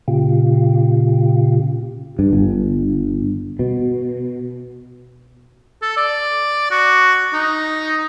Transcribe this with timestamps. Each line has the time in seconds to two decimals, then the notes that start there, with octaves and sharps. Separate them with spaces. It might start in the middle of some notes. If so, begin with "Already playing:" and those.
0.08 A#2 C#3 F4 G4
2.19 G2
2.33 G1
3.59 B2
5.82 A4
5.97 D5
6.71 F#4
7.33 D#4